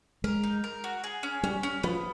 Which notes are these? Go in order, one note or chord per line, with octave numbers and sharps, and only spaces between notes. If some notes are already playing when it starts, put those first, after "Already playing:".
G#3 A#4
D#4
A#4
F#4
G#4
C#4
G3 C#4
C#4
F3 B3